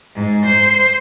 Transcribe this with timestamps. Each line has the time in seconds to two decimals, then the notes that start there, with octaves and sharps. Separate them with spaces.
0.15 G#2
0.46 C5